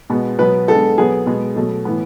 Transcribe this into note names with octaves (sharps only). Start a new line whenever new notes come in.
B2 G#3 B3
B2 F#3 B3 B4
D3 G#3 B3 A4
B2 F#3 B3 G#4
B2 G#3 B3
B2 F#3 A3
A2 E3 B3